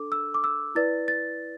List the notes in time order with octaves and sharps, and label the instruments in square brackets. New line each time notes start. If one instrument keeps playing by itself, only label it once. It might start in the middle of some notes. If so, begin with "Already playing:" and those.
Already playing: [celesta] D4 A4 D6
E6
D6
E6
E4 B4 D5 A6
A6